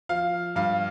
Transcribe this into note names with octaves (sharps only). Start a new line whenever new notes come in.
F3 F5
G2 F5